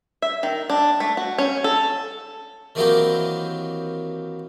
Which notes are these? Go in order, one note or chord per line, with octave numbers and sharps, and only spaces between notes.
E5
D#3
D4
A3
F#4
C#4
A4
D#3 E3 F#3 A#3 C4 G4